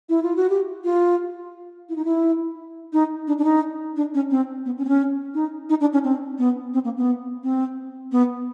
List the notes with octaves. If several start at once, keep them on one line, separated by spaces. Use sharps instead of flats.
E4
F4
F#4
G4
F4
E4
D#4
E4
D#4
D4
D4
D#4
D4
C#4
C4
B3
C#4
C4
C#4
D#4
D#4
D4
C#4
C4
B3
C4
A#3
B3
C4
B3